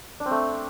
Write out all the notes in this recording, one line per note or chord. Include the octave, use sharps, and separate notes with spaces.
D4
C4
A3